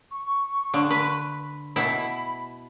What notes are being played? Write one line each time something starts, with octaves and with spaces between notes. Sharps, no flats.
C#6
D3
B4
B2 E4 B5